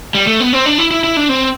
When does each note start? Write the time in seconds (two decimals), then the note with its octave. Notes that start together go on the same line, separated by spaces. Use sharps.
0.15 G3
0.27 A3
0.40 B3
0.53 C4
0.66 D4
0.78 E4
0.91 E4
1.04 E4
1.17 D4
1.29 C4